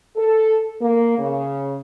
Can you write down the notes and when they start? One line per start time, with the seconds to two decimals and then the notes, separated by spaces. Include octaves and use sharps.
0.17 A4
0.81 A#3
1.18 C#3